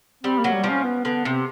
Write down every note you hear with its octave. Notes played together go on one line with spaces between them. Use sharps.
G3 C4
A#3
F#3
G3
F3
C#4
B3
D3 B3
C3 C4